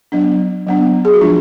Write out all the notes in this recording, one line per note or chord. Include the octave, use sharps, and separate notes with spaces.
F#3 B3 D4
F#3 B3 D4
G#4
F#4
F3 G#3 D4 F4